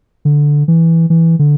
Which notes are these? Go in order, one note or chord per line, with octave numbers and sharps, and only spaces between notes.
D3
E3
E3
D3